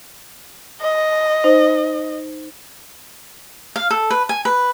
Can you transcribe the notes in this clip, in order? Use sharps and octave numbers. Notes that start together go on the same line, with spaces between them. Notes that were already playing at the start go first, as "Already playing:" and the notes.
D#5
D#4 C5
F5
A4
B4
G#5
B4